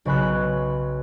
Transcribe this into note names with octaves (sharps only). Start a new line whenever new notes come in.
B1 C#3 C#5 B5 F#6 C7